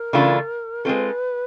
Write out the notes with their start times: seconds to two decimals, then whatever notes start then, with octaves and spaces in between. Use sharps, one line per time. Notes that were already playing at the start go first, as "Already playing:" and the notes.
Already playing: A#4
0.13 C#3 E3 A3 D4 F4
0.85 G#3 C4 F4 A4 B4